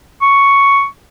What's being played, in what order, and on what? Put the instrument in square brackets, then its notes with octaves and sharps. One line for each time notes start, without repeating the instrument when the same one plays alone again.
[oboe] C#6